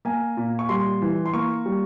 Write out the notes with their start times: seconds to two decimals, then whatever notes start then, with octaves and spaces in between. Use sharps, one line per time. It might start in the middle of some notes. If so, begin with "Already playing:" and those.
0.05 A#3 G#5
0.37 A#2
0.59 C#6
0.69 G3 C6
1.02 E3
1.26 C6
1.33 A#3 C#6
1.66 G3